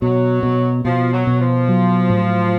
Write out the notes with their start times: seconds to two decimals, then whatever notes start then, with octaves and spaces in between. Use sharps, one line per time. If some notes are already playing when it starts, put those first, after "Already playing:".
0.02 B2 F#3
0.43 B2
0.85 B2 F3
1.13 F#3
1.27 B2
1.40 F3
1.68 F#3
2.10 A2